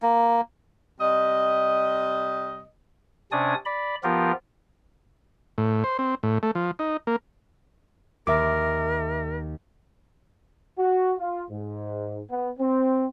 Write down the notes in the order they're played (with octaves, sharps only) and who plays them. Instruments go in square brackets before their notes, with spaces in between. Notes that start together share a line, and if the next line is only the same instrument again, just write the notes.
[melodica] A#3
[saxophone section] C3 G3 D#5
[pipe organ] C3 C#4 D4 D5 G#5 D#6
D5 B5
F3 B3 F4 G4 A#4
[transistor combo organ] A2
C5
C4
A2
A3
F3
D#4
A#3
[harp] D#2 [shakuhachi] A#4 [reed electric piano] E5 D6
[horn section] F#4
F4
G#2
B3
C4